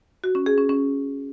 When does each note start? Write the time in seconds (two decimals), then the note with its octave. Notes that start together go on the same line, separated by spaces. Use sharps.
0.24 F#4
0.35 C#4
0.46 G#4
0.58 C#4
0.69 C#4